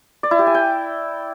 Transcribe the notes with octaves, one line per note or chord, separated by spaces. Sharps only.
D5
E4
G4
G#5
G5